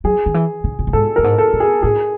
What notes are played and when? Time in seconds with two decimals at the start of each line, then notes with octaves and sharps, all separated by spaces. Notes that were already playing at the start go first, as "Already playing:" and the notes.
0.04 F#3 G#4
0.26 D#3
0.34 E3
0.64 D3
0.79 A#2
0.87 A2
0.93 G#2 A4
1.16 G2 A#4
1.24 G#2
1.38 A4
1.53 A2
1.60 G#4
1.83 A2 G#4